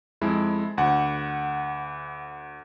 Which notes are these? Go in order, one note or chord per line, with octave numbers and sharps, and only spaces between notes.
F2 G#3 E4
D2 F#5